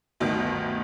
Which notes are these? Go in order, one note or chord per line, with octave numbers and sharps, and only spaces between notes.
G1 D2 B2 D#3